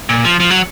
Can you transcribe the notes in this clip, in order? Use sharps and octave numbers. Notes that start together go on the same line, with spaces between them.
A#2
F3
F3
F#3